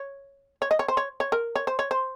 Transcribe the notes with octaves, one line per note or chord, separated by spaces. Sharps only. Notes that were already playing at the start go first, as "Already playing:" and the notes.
Already playing: C#5
C#5
D#5
C#5
C5
C#5
C#5
A#4
C#5
C5
C#5
C5